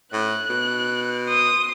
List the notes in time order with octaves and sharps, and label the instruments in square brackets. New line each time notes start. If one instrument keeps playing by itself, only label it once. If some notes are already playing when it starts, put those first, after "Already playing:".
[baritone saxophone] A2 [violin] F#6
[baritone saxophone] B2
[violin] C6 D#6